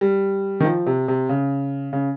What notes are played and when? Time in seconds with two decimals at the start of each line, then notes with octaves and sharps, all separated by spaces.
0.01 G3
0.60 D#3
0.65 F3
0.86 C3
1.08 C3
1.29 C#3
1.93 C#3